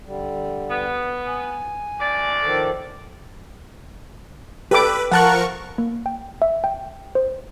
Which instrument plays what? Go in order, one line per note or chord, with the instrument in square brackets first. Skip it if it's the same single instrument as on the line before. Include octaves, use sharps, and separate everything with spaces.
[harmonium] D3 G3
[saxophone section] B3
[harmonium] G#5
[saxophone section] D2 D5
[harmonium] D#3 F3 A4
[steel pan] G4 A4 D6 [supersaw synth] B4
[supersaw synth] F3 A#4 C#6 [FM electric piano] F#5 A5 F#6
[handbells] A#3
G5
E5
G5
C5